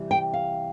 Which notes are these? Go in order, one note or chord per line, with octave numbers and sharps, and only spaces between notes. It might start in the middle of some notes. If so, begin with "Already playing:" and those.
Already playing: C3 E3 G3
G5
F5